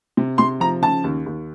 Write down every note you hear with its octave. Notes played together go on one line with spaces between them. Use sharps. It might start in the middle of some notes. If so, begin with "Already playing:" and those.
C3
C3 C6
F3 A#5
C#3 A5
D#2
D#2